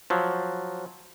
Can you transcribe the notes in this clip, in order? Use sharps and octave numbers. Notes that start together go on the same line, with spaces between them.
F3 F#3